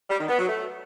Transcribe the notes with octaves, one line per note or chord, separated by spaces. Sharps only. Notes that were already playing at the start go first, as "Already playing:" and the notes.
G3
D#3
B3
F#3
A3